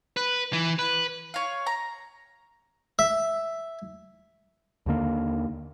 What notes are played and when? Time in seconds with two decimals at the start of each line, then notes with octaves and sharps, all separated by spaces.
0.17 B4
0.53 E3
0.79 B4
1.34 C#5 F5
1.67 A#5
2.99 E5
4.86 D#2 D3 A#3